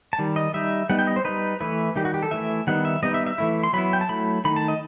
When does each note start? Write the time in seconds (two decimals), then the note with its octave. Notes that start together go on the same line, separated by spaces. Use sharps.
0.13 A5
0.19 D#3 G3
0.36 D#5
0.54 G3 D#4 E5
0.89 G3 B3 D#4 F#5
0.99 G5
1.07 D#5
1.16 C5
1.25 G3 D#4 B4
1.60 E3 A3 E4 B4
1.96 D#3 G3 D#4 G4
2.05 F#4
2.14 G4
2.23 A4
2.31 E3 A3 E4 E5
2.67 D#3 G3 B3 D#4 F#5
2.85 E5
3.03 G3 B3 D#4 D#5
3.14 E5
3.26 E5
3.38 E3 A3 E4
3.63 C6
3.73 F#3 B3 E4 B5
3.93 G5
4.01 A5
4.09 F#3 A3 E4 B5
4.44 D#3 A3 D#4 B5
4.56 A5
4.68 D#5